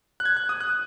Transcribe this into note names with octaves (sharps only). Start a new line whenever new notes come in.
F#6
G#6
F#6
D#6
F#6